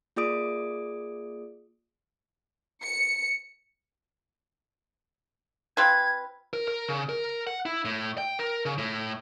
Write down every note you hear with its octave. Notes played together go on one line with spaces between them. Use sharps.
A#3 F4 G#4 D5 D#6 D7
C#7
C4 F4 B4 G#6
A#4
A#4
C#3
A#4
F#5
E4
A2
G5
A#4
C#3
A2